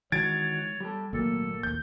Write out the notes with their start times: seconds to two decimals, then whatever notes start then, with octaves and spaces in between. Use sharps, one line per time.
0.12 D#3 E3 G#3 F#4 C#5 G#6 A6 D7
0.80 G3 G4 A4
1.13 G#1 A#2 F#3 A3 A#3 A4
1.63 A1 D#2 G6